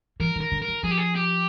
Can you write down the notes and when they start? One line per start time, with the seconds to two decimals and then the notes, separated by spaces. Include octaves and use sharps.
0.20 E3 A#4
0.36 D#3 A#4
0.52 D3
0.62 A#4
0.68 D#3
0.83 F3 G#4
0.91 G4
0.97 G#4
1.15 G4